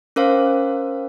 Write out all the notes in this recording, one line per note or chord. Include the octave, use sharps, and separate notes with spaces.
C#4 A#4 C5 F5